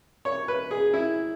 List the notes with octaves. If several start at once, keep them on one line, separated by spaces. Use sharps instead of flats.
C#5
B4
G#4
E4